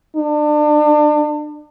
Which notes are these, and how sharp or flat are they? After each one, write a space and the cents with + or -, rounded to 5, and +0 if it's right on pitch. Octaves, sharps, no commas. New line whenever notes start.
D4 +30